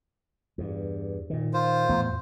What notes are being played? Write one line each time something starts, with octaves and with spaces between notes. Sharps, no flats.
E2 G2
A#2 D#3
F4 C5
E2 A2 B3